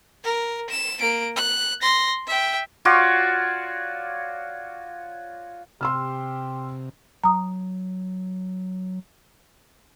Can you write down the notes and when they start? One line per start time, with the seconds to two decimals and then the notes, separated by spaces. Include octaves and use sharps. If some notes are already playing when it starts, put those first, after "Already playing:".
0.23 A#4
0.70 E7
1.00 A#3 D7
1.36 F#6
1.82 C6 A#6
2.27 E5 G5
2.85 F4 F#4 C#5 D5
5.81 C3 G4 C6 E6 F6
7.24 F#3 A#5 D#6